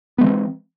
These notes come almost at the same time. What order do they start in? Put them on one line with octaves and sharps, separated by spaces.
B3 G#3 E3 C4